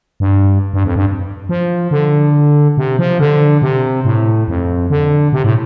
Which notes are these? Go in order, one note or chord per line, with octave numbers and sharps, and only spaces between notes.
G2
G2
F2
G2
F3
D3
C3
F3
D3
C3
A2
F2
D3
C3
A2